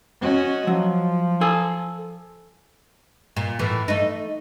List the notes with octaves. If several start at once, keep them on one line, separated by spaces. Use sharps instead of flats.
C#4 F#4 D#5
F3 F#3
A4 G#5
A#2
A2 E3
A3 D#4